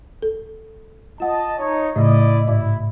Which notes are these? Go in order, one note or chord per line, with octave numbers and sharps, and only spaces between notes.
A4
F4 D#5 F#5 A5
D#4 C#5
A2 C#3 A3 E4 D5 D#5
G#2 E4 D5 D6